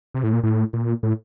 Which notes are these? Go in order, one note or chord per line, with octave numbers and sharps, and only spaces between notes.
C3
A2
A#2
A2
A#2
A2